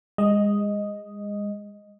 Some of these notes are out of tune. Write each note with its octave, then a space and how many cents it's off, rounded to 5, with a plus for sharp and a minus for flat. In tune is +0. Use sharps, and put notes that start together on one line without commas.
G#3 -30 D#5 +0